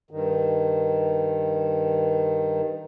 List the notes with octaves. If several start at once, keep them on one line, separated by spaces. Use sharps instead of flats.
G2 D#3